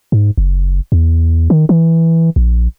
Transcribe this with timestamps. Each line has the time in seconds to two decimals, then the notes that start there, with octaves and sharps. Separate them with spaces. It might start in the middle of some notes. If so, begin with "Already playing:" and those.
0.12 G#2
0.38 F#1
0.92 E2
1.50 D#3
1.69 E3
2.36 A#1